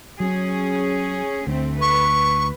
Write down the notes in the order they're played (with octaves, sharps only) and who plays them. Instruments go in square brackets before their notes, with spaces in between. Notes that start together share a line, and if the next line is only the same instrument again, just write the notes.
[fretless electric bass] F#3 [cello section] C#4 G#4
[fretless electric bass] D2 [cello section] A3 C4
[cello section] B4 [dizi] C#6